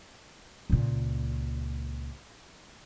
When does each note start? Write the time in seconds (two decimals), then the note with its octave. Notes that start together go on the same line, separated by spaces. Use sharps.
0.70 C#2 A#2